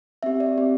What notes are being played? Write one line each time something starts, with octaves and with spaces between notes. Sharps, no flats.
C4 G4 E5
D5
C4 G4